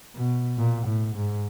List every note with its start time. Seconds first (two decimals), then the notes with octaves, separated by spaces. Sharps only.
0.16 B2
0.58 A#2
0.86 A2
1.15 G#2